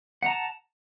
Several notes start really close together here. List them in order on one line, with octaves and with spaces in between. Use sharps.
F#5 A#5 A5